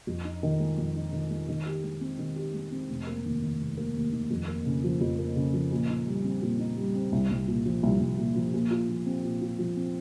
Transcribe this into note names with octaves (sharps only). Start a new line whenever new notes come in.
F2
D#4
D#3
G#3
F2
D#4
D#3
G#3
D#3
G4
G#3
C4
D#3
G4
G#3
C4
F1
A#3
D#2
D#3
F1
A#3
D#2
D#3
F2
A#3
C#3
F3
F2
A#3
C#3
F3
A#2
D#4
G3
C4
A#2
D#4
G3
C4
C2
C2
A#2
F3
C2
C2
A#2
F3
A#2
F4
F3
C4
A#2
F4
F3
C4